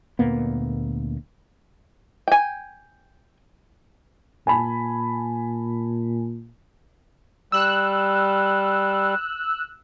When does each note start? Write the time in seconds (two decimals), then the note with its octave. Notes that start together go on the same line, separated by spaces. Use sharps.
0.19 D2 A#2 A#3 B3
2.28 G5 G#5
4.47 A#2 G#5 A5 B5
7.52 G3 E6 F#6